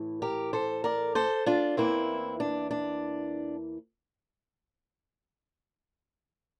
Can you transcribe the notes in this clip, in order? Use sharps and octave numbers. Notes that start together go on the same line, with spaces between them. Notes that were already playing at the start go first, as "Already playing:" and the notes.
Already playing: A2 E3
G4 A#4
A4 C5
A#4 D5
A4 C5
D4 F4
E2 E3 A#3 C4 E4
D4
D4